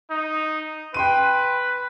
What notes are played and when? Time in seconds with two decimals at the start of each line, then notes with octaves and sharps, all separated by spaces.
0.11 D#4
0.94 B4 G5 C6 D#7